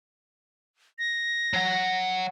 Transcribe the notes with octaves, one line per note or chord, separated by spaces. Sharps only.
A#6
F#3 F#5